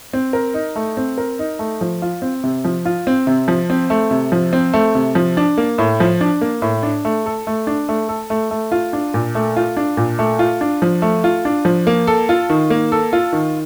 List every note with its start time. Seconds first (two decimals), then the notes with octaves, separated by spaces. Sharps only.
0.13 C4
0.33 A#4
0.54 D#4
0.76 A3
0.97 C4
1.18 A#4
1.39 D#4
1.59 A3
1.81 F3
2.02 F4
2.22 C4
2.44 C3
2.65 F3
2.85 F4
3.07 C4
3.27 C3
3.48 F3
3.70 C4
3.90 A3
4.11 C3
4.32 F3
4.53 C4
4.74 A3
4.95 C3
5.15 F3
5.37 D4
5.58 A#3
5.78 A2
6.00 F3
6.21 D4
6.41 A#3
6.62 A2
6.83 D4
7.05 A3
7.26 A4
7.47 A3
7.67 D4
7.89 A3
8.09 A4
8.30 A3
8.51 A3
8.72 F4
8.93 D4
9.14 A#2
9.35 A3
9.56 F4
9.77 D4
9.97 A#2
10.19 A3
10.39 F4
10.61 D4
10.82 F3
11.02 A3
11.24 F4
11.45 D4
11.65 F3
11.87 A#3
12.07 A4
12.29 F4
12.50 D#3
12.70 A#3
12.92 A4
13.13 F4
13.33 D#3